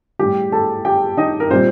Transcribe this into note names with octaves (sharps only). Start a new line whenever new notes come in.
A2 G3 G4 G5
A4 A5
G4 G5
D#4 D#5
A#4
A#2 G3 C4 C5